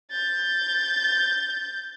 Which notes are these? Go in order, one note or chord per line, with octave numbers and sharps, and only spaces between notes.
G6 A6